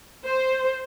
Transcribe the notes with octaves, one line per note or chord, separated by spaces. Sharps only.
C5